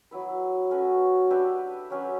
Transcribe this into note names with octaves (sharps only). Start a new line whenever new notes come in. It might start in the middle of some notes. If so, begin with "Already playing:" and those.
F#3 B3 E4 B4
A3 C#4 F#4 B4
D4 G4 B4 E5
F#3 C#4 G4 B4